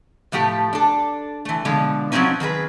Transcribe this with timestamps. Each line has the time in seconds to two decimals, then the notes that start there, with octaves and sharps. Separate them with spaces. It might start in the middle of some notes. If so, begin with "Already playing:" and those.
0.32 A2 F3 A3 G4 G5
0.73 D4 A4
1.45 E3 A3
1.65 B2 D3 F3 G#3
2.12 F3 F#3 A#3 C4 C#4 D#4
2.40 D#3 C4 G#4 B4